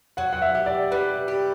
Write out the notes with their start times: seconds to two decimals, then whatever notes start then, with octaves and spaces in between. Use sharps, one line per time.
0.17 F#3 F#5
0.33 F#5
0.42 E5
0.55 G4
0.66 D5
0.91 G3 B4
1.28 G4